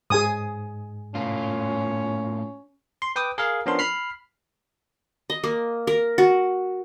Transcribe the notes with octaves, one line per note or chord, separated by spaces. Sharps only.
G#2 G#4 G#5 D#6
A2 C#4 F4
C6
B4 G5 D6 D#6
G#4 A#4 F5
F3 B3 C#4 D4 A#4 C6
B5 F6 C7
D#5
A#3
A#4
F#4